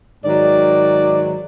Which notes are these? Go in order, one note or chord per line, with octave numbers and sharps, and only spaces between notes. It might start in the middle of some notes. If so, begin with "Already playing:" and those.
G#2 D#3 F#3 D5